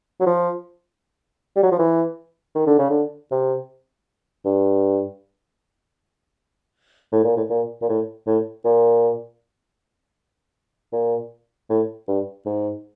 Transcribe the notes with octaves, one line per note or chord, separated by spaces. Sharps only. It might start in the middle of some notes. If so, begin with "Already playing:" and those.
F#3
F3
G3
F#3
F3
E3
D#3
D3
C#3
D3
C3
G2
A2
A#2
A2
A#2
A#2
A2
A2
A#2
A#2
A2
G2
G#2